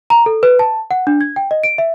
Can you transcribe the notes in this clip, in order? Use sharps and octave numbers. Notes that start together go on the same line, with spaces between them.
A#5
A4
B4
A5
F#5
D4
G#6
G5
D#5
D7
E5